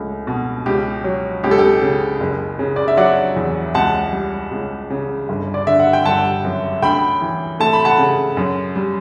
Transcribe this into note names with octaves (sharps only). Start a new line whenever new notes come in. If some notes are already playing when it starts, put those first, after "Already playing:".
Already playing: C#2 A3
B2
C#2 G4
F#3
C#2 G4
A4
G4
C#3
F#1
C#3
D5
E5
F#3 D5 F#5
E2
C#2 F#5 A5
G3
C#2
C#3
G1
D5
D3 E5
F#5
G5
G1 F#5 A5
F#2
D2 G5 B5
E3
A3 A5
B5
F#5 A5
C#3
F#2
G3